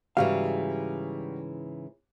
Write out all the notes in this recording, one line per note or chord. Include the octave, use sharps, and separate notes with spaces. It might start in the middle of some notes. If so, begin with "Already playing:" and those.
G#2 C#3 E3 G3 F#4 F5